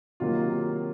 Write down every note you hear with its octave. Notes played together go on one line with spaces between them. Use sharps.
C3 D#3 F#3 A#3 F4